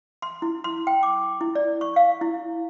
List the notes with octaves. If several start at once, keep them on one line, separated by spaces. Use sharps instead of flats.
C6
E4
C6
G5
D6
E4
D5
C#6
F5
E4